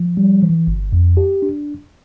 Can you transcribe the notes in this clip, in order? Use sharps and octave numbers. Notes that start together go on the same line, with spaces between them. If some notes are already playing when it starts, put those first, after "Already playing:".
Already playing: F3
G3
E3
G1
F2
G4
D4